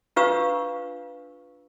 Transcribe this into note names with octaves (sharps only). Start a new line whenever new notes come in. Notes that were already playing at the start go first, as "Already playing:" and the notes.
D4 F4 B4 F5 C#6 E6